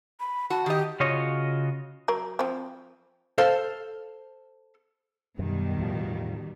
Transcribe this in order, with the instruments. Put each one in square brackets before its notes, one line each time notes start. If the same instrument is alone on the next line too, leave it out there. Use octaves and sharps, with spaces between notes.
[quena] B5
[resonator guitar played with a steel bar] F#4 [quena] A5
[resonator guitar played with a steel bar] D#3 D#5 [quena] G4
[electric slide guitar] C#3 F4 F#4 C#5 D#5
[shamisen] F#3 A#4
F3 C4
[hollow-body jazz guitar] A4 C5 F5
[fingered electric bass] F#2 [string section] B2 D#3 G3
[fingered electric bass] E2 A2 F3